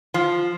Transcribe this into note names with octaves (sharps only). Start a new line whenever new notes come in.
F3